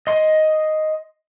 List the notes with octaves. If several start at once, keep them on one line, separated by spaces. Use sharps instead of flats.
D#5 C6